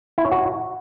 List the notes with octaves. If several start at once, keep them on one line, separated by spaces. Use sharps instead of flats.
E4
C#5
F#4